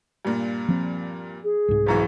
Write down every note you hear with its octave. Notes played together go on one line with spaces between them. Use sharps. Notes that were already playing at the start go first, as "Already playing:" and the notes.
G2 A#2
F3 C4
G#4
C2 G#2
F#1 F#2 E3